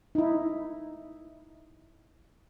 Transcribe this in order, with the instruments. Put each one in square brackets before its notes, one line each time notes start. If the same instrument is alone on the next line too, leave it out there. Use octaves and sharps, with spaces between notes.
[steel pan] D#4 E4